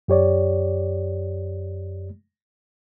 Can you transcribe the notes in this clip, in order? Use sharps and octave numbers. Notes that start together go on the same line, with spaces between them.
F#2 G4 C#5 D5